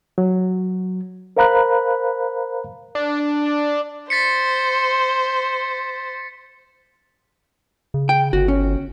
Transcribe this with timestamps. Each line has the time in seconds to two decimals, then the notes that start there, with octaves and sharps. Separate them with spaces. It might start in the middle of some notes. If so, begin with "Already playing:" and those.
0.18 F#3
1.37 A#4 C5 F5 A#5 B5 F#6
2.95 D4
4.10 C5 A6 B6 C#7
7.94 C#3
8.09 G5
8.33 G1 F#4
8.48 C#4